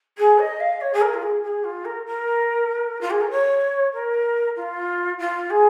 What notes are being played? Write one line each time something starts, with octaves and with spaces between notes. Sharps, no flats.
G#4
D#5
F5
C#5
G#4
A#4
F4
G#4
G#4
F4
A#4
A#4
F4
G#4
A#4
C#5
A#4
F4
F4
G#4